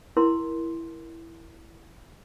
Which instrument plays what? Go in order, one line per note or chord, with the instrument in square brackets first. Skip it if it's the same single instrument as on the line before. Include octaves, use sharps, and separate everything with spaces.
[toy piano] E4 A#4 C6